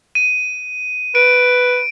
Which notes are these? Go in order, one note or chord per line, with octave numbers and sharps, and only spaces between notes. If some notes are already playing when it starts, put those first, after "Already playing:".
D#7
B4 D7